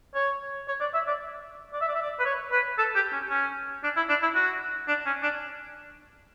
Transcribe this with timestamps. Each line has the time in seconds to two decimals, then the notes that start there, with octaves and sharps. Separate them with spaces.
0.15 C#5
0.68 C#5
0.81 D5
0.94 E5
1.07 D5
1.74 D5
1.81 E5
1.88 D5
1.95 E5
2.02 D5
2.19 B4
2.25 C#5
2.52 B4
2.78 A4
2.95 G4
3.13 C#4
3.30 C#4
3.84 D4
3.96 E4
4.09 D4
4.22 E4
4.35 F#4
4.88 D4
5.06 C#4
5.23 D4